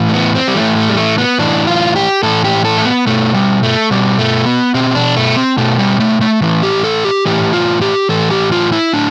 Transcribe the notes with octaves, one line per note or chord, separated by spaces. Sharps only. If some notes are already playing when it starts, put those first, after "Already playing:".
Already playing: A2 E3
A3
B3
C4
G3
A2 E3 A3
A3
G3
A3
B3
A2 E3 D4
F4
G4
A2 E3 A4
G4
A4
A3
B3
B2 A3
G3
A3
B2 G3
A3
B3
B2 C4
D4
A3
C4
B2 A3
G3
A3
A3
A2 E3
G4
A4
G4
A2 E3 G4
F4
G4
A2 E3 A4
G4
F4
E4
A2 D4